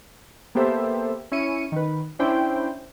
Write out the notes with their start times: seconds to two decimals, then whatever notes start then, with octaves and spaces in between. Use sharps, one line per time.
0.55 A#3 B3 G4 A4 C5 E5
1.32 C#4 E4 C#5 C#7 D#7
1.72 D#3 B4
2.19 C#4 D4 E4 C5 G5